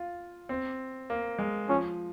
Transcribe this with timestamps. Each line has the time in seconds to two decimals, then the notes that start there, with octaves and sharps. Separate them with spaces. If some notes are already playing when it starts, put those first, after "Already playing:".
Already playing: F4
0.49 C4
1.10 A#3
1.39 G#3
1.69 F3 C#4